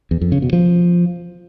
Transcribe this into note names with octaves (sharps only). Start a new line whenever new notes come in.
E2
F2
C#3
B2
F3